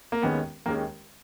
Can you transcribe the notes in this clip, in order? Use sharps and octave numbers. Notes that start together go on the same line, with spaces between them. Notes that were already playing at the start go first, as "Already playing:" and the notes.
A#3
D#2 D#3 G#3 B3 C#4
D#2 D#3 G#3 A#3 C#4